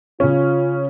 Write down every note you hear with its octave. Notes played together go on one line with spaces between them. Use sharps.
C#3 C#4 F4